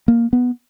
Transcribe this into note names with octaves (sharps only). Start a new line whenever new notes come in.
A#3
B3